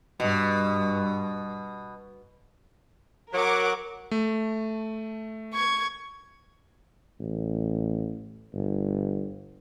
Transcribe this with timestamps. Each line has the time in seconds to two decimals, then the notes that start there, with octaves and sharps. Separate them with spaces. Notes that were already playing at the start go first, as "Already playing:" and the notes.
0.20 G2 B2
3.33 F#3 A#4 F#5 D6
4.11 A3
5.53 C#6 G#6
7.19 A1
8.54 G1